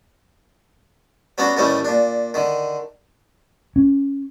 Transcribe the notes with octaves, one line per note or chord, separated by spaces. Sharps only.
F#3 B3 C#4 D4 F#4
A2 D#3 E3 G3 A3 C#4
A#2 D4
D3 D#3
C#4